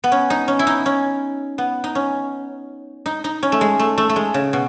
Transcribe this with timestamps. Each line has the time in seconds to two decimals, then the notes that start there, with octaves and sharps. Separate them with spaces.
0.04 B3
0.12 C#4
0.30 D#4
0.48 C#4
0.59 E4
0.67 D#4
0.86 C#4
1.58 B3
1.84 D#4
1.95 C#4
3.06 D#4
3.24 D#4
3.43 C#4
3.52 A3
3.61 G#3
3.79 A3
3.98 A3
4.09 A3
4.16 G#3
4.34 C#3
4.53 B2